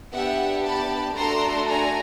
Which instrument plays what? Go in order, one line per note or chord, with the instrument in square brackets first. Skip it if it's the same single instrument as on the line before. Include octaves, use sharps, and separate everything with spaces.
[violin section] B3 D4 G4 E5 F#5
A5 B5
A3 D4 F#4 A4 A#5 C6
G#5 A#5